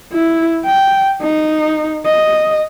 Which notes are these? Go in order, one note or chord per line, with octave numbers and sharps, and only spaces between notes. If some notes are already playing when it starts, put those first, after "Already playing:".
E4
G5
D#4
D#5